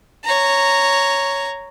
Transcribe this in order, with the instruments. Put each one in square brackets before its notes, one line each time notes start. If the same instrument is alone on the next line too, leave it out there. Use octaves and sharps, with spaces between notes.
[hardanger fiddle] C#5 A#5